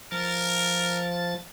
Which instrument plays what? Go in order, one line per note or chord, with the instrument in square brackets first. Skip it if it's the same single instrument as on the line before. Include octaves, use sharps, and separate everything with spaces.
[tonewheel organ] F3 A6 [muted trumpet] A#4